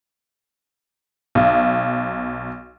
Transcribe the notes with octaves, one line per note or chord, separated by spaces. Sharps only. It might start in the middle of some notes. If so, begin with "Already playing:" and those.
B1